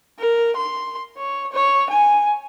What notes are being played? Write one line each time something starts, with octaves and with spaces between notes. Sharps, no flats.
A#4
C6
C#5
C#5
G#5